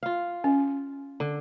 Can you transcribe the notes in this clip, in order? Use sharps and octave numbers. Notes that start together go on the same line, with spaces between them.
F4 F5
C#4
D3